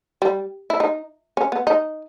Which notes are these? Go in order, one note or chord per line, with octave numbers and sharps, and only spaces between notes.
G3
E4
D#4
C#4
B3
D#4